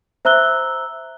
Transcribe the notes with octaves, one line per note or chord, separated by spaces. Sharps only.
C5 E5 A#5 E6 F#6 G7